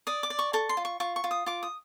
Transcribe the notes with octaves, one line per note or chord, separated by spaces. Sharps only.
D5 D#6
D6
D5
C#6
A4 C#6
C6
F4
C#6
F4 C#6
C#6
F4
D#6
F4 D6
D#6